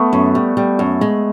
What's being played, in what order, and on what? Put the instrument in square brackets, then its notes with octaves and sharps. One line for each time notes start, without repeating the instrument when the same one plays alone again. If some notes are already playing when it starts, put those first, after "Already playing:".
Already playing: [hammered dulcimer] A3 B3
[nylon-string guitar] F#2
G3
G3
F#2
G#3